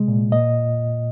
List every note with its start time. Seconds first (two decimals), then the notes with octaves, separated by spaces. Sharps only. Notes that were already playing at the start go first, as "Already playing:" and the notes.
Already playing: C3 G#3
0.08 A#2
0.32 A#2 D#5